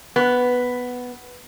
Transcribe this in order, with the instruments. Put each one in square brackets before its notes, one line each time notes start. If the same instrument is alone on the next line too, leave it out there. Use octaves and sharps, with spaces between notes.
[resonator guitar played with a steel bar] B3